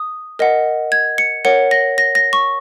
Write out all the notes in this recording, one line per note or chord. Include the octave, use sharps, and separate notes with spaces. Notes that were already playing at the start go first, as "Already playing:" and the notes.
Already playing: D#6
A#4 D#5 F#5
G#6
C#7
A#4 C#5 F#5 C#7
A#6
A#6
A#6
C#6